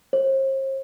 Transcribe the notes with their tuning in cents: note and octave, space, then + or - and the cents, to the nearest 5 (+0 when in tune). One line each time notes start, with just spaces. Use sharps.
C5 +40